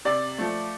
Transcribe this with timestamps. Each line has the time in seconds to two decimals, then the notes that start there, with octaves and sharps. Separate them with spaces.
0.05 C3 D5
0.38 F3 A3